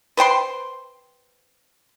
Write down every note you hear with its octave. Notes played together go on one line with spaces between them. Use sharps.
B4 C5 G5 C6